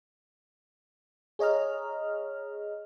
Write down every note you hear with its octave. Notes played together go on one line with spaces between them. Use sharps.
G#4 C#5 D#5 A#5 F6